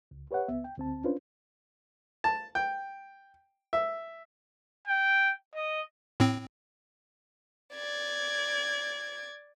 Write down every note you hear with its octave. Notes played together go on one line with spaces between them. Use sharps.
C#2
G4 B4 C#5 E5 F#5
C#2 B3 E5
G5
D2 C4 A5
C#4 D4 F4 B4 C5
A5
G5
E5
G5
D#5
A2 C4
D5 G#6